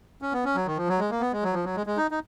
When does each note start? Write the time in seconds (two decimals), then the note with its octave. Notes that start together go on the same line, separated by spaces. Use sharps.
0.22 C#4
0.33 B3
0.45 C#4
0.55 F#3
0.66 D#3
0.77 F3
0.88 F#3
0.99 G#3
1.10 A#3
1.21 B3
1.32 G#3
1.43 F#3
1.53 F3
1.65 F#3
1.76 G#3
1.87 G#3
1.97 D#4
2.11 D#4